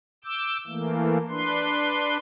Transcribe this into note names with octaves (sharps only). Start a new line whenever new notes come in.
D6 E6 G6
E3 A3 A#3
D4 B4 C6